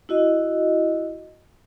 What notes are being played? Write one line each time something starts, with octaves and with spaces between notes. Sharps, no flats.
E4 F#4 D#5